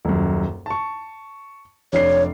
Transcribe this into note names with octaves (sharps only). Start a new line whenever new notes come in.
D#1 F#2
A5 C#6
F1 D4 C#5 C7